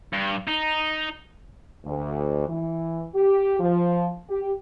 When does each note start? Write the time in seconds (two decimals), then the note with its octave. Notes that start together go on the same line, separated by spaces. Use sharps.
0.13 G2
0.47 D#4
1.85 D2
2.48 E3
3.15 G4
3.60 F3
4.29 G4